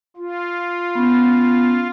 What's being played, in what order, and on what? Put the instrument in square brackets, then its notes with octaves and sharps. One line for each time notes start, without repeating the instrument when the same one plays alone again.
[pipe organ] F4
[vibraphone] B3 C#4